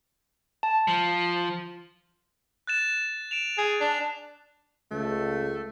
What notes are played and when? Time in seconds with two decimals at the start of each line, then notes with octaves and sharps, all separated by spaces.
0.63 A5
0.88 F3
2.67 F#6 A6 E7
3.31 D7 E7 F7
3.58 G#4
3.81 D4
4.91 C#2 A3